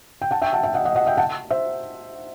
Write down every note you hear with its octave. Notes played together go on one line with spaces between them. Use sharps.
G5
F#5 A5
E5 G5
F#5 A5
E5 G5
D#5 F#5
D#5 F#5
D#5 F#5
E5 G5
F#5 A5
C5 E5